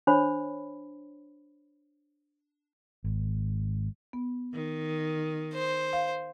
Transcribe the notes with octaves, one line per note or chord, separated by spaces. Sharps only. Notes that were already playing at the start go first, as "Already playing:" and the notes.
D4 C5 C#5 B5
G#1
B3
D#3
C5
F5